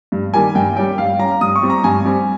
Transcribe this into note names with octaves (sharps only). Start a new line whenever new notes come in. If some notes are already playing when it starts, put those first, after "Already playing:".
G2
D#3 G3 A#3 G#5
G2 G5
G3 C#4 G5
G2 F5
G3 C#4 A#5
G2 D#6
C#6
G3 C4
A#5
G2 G#5
G3 C4